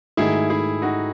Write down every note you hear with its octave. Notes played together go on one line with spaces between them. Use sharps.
G#2 D#3 A3 D#4 E4 F#4 G#4
E4 G#4
D#4 F#4